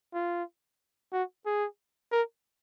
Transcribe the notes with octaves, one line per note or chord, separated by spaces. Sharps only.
F4
F#4
G#4
A#4